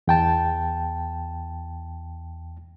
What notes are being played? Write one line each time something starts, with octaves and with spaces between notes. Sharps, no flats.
E2 G5 A5